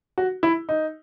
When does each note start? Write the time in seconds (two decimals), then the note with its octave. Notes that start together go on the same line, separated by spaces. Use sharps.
0.18 F#4
0.43 E4
0.69 D#4